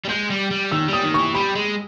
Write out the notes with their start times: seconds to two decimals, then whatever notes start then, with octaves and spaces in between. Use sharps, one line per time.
0.05 G3
0.09 G#3 G6
0.30 G3
0.51 G3
0.71 D#3 E6
0.88 G3 D#6
1.04 D#3
1.14 E3 C#6
1.35 G3 B5
1.55 G#3